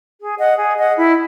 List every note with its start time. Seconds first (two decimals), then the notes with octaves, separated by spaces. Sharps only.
0.19 G#4
0.39 D#5 F#5
0.58 G#4
0.77 D#5 F#5
0.96 E4